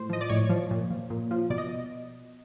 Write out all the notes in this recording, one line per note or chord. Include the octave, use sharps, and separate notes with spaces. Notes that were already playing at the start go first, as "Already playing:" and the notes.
Already playing: A2 C5
F3 D#5
D5
A2 C#5
F3
A#2
F3
A#2
F3
B2 D5
D#5